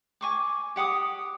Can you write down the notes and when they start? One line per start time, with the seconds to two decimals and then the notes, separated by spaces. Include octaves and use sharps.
0.21 G#5 C#6 D6
0.76 G4 F#5 D6 D#6